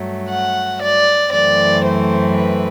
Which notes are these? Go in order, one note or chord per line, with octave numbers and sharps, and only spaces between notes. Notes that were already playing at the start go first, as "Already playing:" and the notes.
Already playing: G2 F#3 A3
F#5
D5
F#2 E3 A3 C4 D5
C5
B4